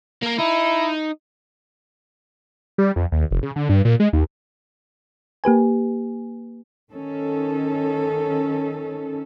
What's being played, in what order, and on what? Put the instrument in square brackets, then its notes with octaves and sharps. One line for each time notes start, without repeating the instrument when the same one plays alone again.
[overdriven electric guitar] A#3 A#4
[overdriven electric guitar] D#4 [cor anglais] E4
[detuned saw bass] G3
F2
D#2
F1
C#3
D3
G2
A#2
G#3
D#2
[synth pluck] A#3 G4 B4 G#5
[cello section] D#3 C#4 A4